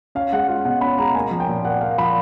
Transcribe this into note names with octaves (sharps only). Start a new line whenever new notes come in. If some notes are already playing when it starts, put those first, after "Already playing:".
C#4 F5
G#3 F#5
F4 F5
B2 F#5
C#4 B5
G#3 A#5
A#3 G#5
F3
G5
A#2
A#2 F#5
A#3 F5
F3 B5